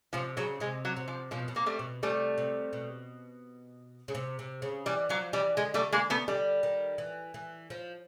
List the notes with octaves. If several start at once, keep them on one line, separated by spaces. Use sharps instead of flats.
C3 F3
C#3 F#3
C3 G#3
F#3
C3
F3
B2 F3
B2
C3 A#3
G3 A3
B2
C3 G3 A3
C3
B2
C#3
C3
C3
C#3
E3 G3
F3 F#3
E3 G3
D3 G#3
G3 A3
G#3 A#3
A3 B3
D3 G3
D#3
E3
E3
F3